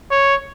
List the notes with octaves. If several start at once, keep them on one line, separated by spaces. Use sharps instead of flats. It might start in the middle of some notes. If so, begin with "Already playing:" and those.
C#5